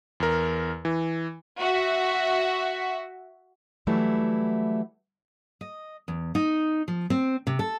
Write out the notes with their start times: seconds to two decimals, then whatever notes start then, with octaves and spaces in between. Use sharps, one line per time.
0.20 E2 A#4
0.85 E3
1.59 F#4 E5
3.87 E3 F#3 G3 A3 E4
5.61 D#5
6.08 E2
6.35 D#4
6.88 F3
7.10 C4
7.47 C3
7.59 A4